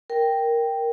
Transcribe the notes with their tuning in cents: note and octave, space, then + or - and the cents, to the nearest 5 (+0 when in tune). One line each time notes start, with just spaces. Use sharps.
A#4 +0 G5 +0